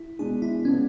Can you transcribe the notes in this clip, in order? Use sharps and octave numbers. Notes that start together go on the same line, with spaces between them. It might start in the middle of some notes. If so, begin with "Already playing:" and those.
Already playing: E4
B2 G#3 D4 G#4
E4
C#3 G#3 B3 C#4 D4